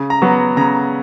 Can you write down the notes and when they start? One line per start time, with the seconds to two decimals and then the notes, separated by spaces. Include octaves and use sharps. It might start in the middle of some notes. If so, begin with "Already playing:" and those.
Already playing: C#3
0.10 A#5
0.22 F#3 B3
0.57 C#3 A#5